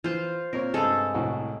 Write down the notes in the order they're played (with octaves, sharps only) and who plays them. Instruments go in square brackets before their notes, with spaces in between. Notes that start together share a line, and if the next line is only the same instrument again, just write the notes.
[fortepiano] E3 [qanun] F4 C5
[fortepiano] A#2 C4 C#5 [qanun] A#4
[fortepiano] G2 C3 [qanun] G#3 A4
[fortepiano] C2 A2 F#4